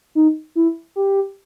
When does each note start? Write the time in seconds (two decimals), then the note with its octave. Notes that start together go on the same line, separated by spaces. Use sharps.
0.15 D#4
0.55 E4
0.96 G4